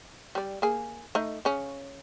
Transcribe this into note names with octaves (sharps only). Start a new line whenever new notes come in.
G3 D5
A#3 G#4
A3 D#4 D#5
C#3 C#4